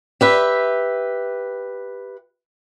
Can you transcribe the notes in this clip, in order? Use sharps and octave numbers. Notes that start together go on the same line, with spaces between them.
G4 B4 E5